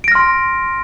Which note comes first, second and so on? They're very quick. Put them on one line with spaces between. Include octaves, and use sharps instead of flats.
D7 A#6 F6 C6